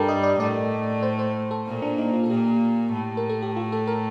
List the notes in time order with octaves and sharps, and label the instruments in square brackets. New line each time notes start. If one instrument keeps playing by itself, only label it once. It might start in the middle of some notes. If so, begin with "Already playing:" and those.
Already playing: [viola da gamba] G2 G3 [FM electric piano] A4 A#4
[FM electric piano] D#5
D5
[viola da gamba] A2 A3 [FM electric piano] D5
[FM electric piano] C5
C5
A4
[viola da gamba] A#2 A#3
[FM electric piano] D4
D#4
F4
A4
[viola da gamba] A#2 A#3 [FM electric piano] G4
[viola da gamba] A2 A3
[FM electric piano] A#4
A4
G4
F4
A4
A#4